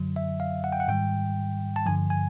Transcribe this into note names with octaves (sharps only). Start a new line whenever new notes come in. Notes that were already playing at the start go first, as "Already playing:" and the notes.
Already playing: F#2 D3 F#3
E5
F5
F#5
G5
F#5
G#2 D#3 G3 G5
A5
G2 D3 F3 G#5
G#5